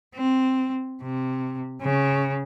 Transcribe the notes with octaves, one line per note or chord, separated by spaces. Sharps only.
C4
C3
C#3